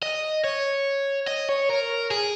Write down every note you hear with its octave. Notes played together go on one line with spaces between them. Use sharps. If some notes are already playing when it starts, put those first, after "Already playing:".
D#5
C#5
D#5
C#5
A#4
G#4